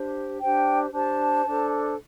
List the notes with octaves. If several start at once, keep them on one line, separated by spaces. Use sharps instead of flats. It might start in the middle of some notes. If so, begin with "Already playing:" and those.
Already playing: D4 G4 C5
D4 G4 C5 G5
D4 G4 C5 A5
D4 A4 C5